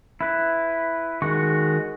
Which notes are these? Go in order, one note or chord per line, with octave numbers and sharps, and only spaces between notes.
E4 B4
D#3 G#3 F#4 C#6